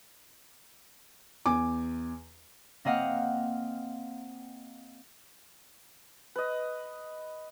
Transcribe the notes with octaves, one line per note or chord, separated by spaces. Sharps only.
E2 G#5 D6
A#3 C4 D#5 F5 F#5
B4 D#5